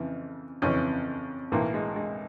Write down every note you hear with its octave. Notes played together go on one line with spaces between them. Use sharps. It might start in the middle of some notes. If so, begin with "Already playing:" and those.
Already playing: F2 C#3 E3
F2 C#3 E3 C#4
B1 A2 E3 A#3
G#3
G#3